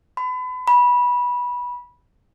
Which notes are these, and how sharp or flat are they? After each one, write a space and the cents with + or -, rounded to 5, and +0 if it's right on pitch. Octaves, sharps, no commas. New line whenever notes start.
B5 +35
B5 -15